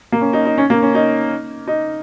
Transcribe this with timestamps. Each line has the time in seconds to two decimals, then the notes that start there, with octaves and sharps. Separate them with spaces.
0.12 A#3
0.21 C#4
0.33 D#4
0.45 D#4
0.58 C#4
0.70 A#3
0.82 C#4
0.95 D#4
1.67 D#4